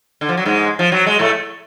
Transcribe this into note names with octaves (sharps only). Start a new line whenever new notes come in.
D3
F3
F#3
G#2 G#3
F3
F#3
G#3
A2 A3